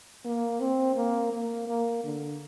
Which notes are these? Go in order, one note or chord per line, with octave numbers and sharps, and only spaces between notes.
A#3
C4
A#3
A#3
A#3
D3